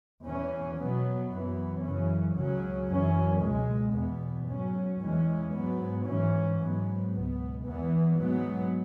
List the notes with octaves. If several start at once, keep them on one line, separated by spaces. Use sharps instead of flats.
E2 E3 C#4
B2 F#3 B3
F#2 E3 B3
F#2 C#3 E3 C#4
C#2 C#3 F#3 C#4
F#2 E3 C#4
C#2 B2 G#3
E2 B2 B3
G#2 F#3 C#4
E2 E3 G#3 C#4
G#2 F#3 B3
G#2 E3 C#4
G#2 F#3 B3
C#2 B2 B3
E2 E3 B3
G#2 F#3 B3